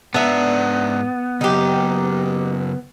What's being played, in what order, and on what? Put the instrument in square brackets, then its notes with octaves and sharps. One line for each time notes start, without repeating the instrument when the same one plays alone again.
[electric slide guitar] G#2 D5 A#5 [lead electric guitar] B3 [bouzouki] D4 E5
[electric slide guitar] C#3 F#3 [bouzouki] D#4 G4